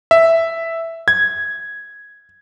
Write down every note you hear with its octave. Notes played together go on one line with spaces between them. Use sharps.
E5
G#6